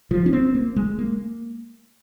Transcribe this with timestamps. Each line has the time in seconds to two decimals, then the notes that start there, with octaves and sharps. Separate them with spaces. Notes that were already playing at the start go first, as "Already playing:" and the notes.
0.11 F3
0.26 C#4
0.33 C4
0.55 A#3
0.76 G#3
0.99 A#3